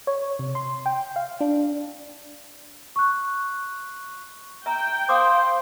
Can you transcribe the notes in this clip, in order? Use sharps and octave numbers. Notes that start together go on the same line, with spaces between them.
C#5
C3
C6
G5
F5
D4
C#6 F#6
E5 G5 A#5
C5 F5 D6 D#6